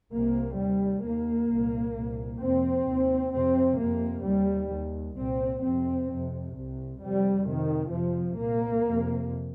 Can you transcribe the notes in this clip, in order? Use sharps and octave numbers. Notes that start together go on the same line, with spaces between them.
C2 C3 A#3
D#2 G3
D#2 A#3
C2 A#2
C2 A#2
F2 C3 C4
D#2
F2 C3 C4
F2 C3 A#3
D#2 G3
D#2
C2 A#2 C4
F2 C3 C4
F2 C3
C2 C3
F2 C3 G3
F2 C3 D#3
F2 C3 F3
C2 A#2 A#3
F2 C3